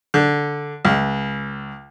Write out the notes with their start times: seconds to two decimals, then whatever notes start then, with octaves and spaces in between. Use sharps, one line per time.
0.14 D3
0.85 C#2